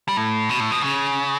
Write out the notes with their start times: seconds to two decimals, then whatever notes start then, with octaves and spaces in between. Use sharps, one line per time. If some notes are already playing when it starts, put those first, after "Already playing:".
0.08 G3
0.17 A2
0.49 B2
0.60 A2
0.71 B2
0.82 C#3